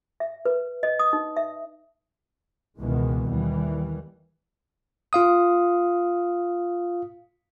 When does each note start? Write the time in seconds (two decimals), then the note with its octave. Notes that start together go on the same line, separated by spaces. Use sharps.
0.20 E5
0.46 B4
0.83 D#5
0.99 D#6
1.13 D#4
1.37 E5
2.78 C#2 B2 D#3 E3 G#3 B3
3.28 D#2 D#3 E3 G3
5.13 F4 F5 D#6